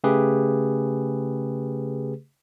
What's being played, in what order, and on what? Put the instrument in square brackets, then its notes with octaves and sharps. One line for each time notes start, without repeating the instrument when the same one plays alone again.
[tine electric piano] C#3 A3 G4 G#4 B4